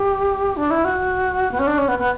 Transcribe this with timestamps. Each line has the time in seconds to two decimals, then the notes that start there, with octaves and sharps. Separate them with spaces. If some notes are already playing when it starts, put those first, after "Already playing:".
Already playing: G4
0.57 D4
0.71 E4
0.85 F#4
1.51 B3
1.59 C#4
1.67 D4
1.78 C#4
1.88 B3
1.99 B3